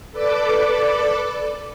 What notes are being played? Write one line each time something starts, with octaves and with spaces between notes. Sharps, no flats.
A4 B4 D5 D6